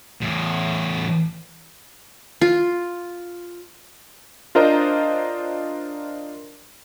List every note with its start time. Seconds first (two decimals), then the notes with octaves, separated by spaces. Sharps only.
0.22 E2 A2
2.41 F4
4.55 D4 F4 A#4 C5 D#5 A#5